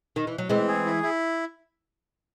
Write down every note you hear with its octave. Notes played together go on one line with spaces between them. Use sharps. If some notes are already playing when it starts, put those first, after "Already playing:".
D#3
E3
F#3
E3 G#3 C4
G#4
E4
E4